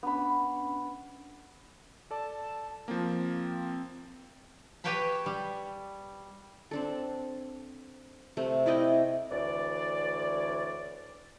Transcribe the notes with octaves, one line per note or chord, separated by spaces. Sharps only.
B3 C#4 D4 B5
A4 D5 A5
F3 A#3 C4
G4 B4 C#5 G5 A5 B5
G3
C4 D4 A4
C3 A3
E4 D5 D#5 G5
D2 E3 C#5 D5